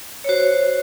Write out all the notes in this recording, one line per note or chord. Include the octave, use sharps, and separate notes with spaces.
C#5
F#4 C5